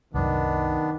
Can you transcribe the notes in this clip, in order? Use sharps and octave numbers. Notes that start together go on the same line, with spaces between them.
C2 F#2 D#3 B3 D4